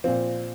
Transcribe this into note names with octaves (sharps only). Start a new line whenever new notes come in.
A#2 F3 C4